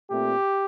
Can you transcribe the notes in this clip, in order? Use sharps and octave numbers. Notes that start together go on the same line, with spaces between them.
A#2 A3 C4 G4